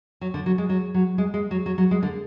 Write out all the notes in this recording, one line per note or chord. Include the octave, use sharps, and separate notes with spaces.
F#3
D3
F#3
G#3
F#3
F#3
G#3
G#3
F#3
F#3
F#3
G#3
D3